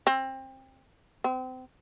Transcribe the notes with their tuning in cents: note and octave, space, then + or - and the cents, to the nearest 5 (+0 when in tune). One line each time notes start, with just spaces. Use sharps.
C4 +25
C4 -30